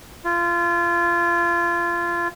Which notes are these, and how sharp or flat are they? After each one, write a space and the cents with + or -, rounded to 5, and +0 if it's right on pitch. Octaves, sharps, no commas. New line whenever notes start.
F4 -25